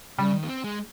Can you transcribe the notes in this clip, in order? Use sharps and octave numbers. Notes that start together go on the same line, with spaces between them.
C#3 G3
D#3
A#3
C4
G#3